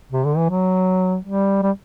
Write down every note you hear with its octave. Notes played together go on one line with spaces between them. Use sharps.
C3
D3
E3
F#3
G3
G3